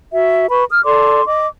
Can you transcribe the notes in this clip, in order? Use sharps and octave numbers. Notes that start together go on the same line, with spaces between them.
F#4 E5
B4 B5 C#6
D#6 F6
A4 D5 C6 D6
D#5 D6